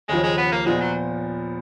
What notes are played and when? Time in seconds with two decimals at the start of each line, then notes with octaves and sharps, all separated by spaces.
0.09 D#2 C#3 F3 G#3
0.23 G#3
0.38 B3
0.52 A#3
0.66 A#2 F3 G#3 B3
0.80 F#3